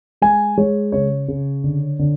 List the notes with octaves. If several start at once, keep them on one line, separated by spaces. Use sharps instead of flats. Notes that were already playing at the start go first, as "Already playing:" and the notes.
G#3 G#5
G#3 C#5
C#3 C#5
C#3
D3
D3